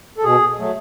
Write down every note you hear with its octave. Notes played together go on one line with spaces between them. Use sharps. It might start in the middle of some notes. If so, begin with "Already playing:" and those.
A4
B2 G#4
F#3 A3